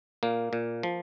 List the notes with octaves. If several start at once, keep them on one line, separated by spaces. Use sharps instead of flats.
A#2 A#3
A#2
F3